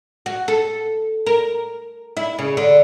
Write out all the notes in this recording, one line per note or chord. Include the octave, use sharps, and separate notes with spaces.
F#4
A4
A#4
E4
C#3
D3